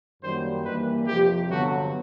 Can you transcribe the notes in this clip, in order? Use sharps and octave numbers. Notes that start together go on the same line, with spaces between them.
F#2 D#3 G3 A#3 C5
G2 E3 G3 A#3 B4
F2 C3 F3 G4
G2 D3 F#3 B3 F#4